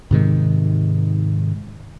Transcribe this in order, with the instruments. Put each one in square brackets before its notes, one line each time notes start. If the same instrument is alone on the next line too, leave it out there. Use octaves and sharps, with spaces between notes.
[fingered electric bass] G#2 C3 D#3 G#3